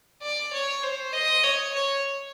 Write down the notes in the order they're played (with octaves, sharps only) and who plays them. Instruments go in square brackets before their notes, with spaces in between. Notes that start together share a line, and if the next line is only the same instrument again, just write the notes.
[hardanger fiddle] D5
C#5
C5
D#5
C#5
C#5